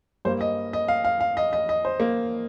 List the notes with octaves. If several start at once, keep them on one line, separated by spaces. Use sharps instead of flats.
G2 G3 A#3 C5
D#5
D#5
F5
F5
F5
D#5
D#5
D#5
C5
A#3